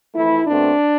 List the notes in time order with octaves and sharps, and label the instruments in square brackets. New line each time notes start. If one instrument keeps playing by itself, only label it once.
[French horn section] F2 E3 A3 E4
B2 A3 C4 D4